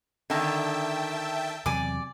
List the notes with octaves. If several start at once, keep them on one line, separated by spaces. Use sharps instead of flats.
D3 D#3 E5 G5 A5
E2 C3 F#3 D5 G#5 D6